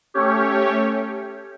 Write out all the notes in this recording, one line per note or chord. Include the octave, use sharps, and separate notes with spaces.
A3 C#4 G4 C#5